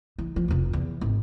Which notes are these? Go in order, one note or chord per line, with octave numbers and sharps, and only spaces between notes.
E3
F3
F1 F2
E2
G#1